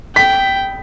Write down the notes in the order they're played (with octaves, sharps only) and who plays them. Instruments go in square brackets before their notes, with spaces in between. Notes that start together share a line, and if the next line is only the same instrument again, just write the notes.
[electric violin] G5 [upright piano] B6